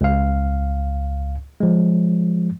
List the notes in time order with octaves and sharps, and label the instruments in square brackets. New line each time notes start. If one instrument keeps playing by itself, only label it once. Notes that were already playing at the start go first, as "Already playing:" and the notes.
[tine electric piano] C#2 F5
F3 G#3